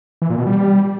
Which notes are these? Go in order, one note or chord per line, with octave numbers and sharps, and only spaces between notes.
E3
A#2
B2
G3